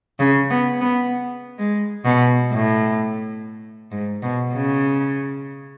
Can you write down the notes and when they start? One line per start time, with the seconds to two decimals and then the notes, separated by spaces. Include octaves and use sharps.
0.19 C#3
0.50 B3
0.81 B3
1.59 G#3
2.05 B2
2.52 A2
3.91 G#2
4.22 B2
4.54 C#3